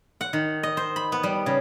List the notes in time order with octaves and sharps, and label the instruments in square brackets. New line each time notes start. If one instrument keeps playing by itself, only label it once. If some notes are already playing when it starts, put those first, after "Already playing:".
[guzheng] F#5
D#3
D#5
C5
B5
B3
G3
C#3